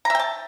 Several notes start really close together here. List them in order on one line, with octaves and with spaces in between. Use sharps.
A#5 E5 G5 A5